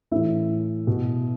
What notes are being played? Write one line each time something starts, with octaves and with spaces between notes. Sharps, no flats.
A2 E3 E4 E5
B2